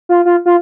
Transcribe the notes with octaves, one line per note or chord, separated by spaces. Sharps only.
F4
F4
F4